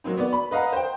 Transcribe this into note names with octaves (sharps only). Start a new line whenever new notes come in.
F#3 A#3 C4 D#4
B3 D5
B5
B4 D#5 F5 F#5 A#5
C5 G5